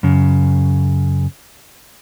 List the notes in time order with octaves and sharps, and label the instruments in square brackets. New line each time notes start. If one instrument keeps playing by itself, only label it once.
[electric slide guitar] F#2 C#3